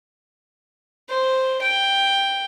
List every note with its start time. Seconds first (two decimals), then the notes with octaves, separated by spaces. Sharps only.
1.09 C5
1.62 G5